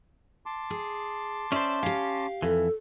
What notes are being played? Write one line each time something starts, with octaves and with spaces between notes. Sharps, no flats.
A5 C6 D6
G#4
C#4 C5 D5 E5
C#4 G4 F5
F2 E3 A4